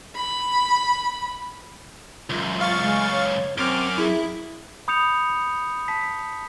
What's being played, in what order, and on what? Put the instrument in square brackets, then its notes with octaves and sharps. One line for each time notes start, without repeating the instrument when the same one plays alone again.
[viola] B5
[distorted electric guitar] C#2 F#2 [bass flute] F4
[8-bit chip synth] F5 C#6 A6
[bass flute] G#3
C#5
[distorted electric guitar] F#2 [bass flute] C4 [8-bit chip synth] D6 F6
[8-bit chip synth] E4 [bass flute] G#4
[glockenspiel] B5 D#6 G6 C#7 F7
A5 B6